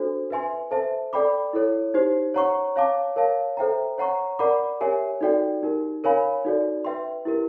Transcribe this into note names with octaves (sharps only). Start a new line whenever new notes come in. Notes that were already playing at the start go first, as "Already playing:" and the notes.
Already playing: D4 F#4 A4 C5
B4 E5 G#5 C6
A4 C5 E5 A5
A4 D5 G5 B5 D6
E4 A4 C#5
D#4 G4 C5
C#5 F#5 A#5 C#6
C#5 F5 A5 D6
A#4 C#5 F5 A5
A4 C5 E5 G5 A#5
C#5 F#5 A#5 C#6
A#4 D5 F#5 B5 D6
G4 A#4 C#5 E5 G#5
D#4 F#4 A4 D5 G5
D#4 G4 A#4
A#4 C#5 F5 G#5 B5
D#4 F#4 A4 D5
B4 E5 G5 C6
E4 G4 A#4